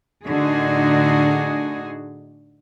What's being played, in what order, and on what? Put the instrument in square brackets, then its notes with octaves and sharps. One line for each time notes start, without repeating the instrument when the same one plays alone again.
[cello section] A2 D3 D4 D#4 F#4 G#4